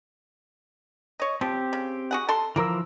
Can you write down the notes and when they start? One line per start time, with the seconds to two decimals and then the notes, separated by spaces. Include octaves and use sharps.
1.20 C#5 D#5
1.41 F3 C4 G4
1.73 C#3
2.11 F#4 G#4 F#5
2.28 A4 A5 C6
2.56 E3 F3 A#3 A#4 E6